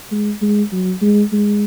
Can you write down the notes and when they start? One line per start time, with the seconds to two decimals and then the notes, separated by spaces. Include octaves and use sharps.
0.12 G#3
0.42 G#3
0.72 F#3
1.02 G#3
1.33 G#3